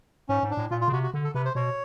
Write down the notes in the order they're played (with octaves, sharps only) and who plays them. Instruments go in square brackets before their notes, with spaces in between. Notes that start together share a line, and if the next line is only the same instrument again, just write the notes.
[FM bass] G#2 [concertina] C#4
[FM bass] G#2
[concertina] D4
[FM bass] A2
[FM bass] A#2 [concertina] F4
[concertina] F4
[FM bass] C#3
[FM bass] C3 [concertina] F#4
[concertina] F#4
[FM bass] D3
[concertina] A4
[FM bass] C3 [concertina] B4
[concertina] C5
[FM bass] B2 [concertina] C#5